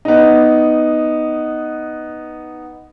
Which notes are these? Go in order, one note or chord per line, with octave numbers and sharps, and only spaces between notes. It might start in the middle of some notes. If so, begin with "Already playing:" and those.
B3 D#4